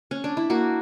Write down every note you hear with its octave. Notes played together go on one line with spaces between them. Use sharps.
C#4
D4
E4
A#3 F#4